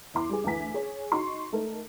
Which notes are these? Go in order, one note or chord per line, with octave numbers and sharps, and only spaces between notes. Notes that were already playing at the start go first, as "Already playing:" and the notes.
E2 E4 C6 D6
G3 G#4
D2 E3 B4 G#5 B6
G#4 C#5
D#4 F#4 C6 C#6
A3 D#4 A4 A#4